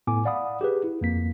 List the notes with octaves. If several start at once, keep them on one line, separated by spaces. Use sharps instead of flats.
A2 B3 G#5 D6
D5 F5 F#5 B5 D#6
G4 G#4 B4
E4
F2 A#3 B6